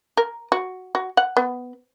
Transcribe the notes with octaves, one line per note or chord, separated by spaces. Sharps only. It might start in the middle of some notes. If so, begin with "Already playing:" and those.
A#4
F#4
F#4
F#5
B3